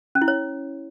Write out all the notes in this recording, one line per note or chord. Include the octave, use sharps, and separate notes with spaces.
C#4
E4
C#5